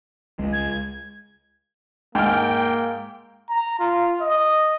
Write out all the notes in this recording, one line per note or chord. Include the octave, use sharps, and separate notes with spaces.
C#2 G#3
G#6
G#2 A#3 G5 F6
A#5
F4
D#5